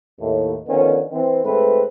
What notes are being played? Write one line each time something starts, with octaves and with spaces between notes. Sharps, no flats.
D#2 A2
D3 D#3 F3 B3 C#4
E3 C4
G#2 A3 C4 B4